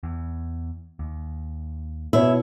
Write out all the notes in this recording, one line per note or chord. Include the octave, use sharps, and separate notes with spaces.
E2
D#2
B2 E4 C#5